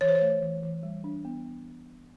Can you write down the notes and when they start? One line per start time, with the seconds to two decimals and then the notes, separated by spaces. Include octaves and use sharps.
0.01 E3 C#5
0.08 C5
0.15 C#5
0.22 A3
0.42 E3
0.63 E3
0.83 G3
1.04 D4
1.25 B3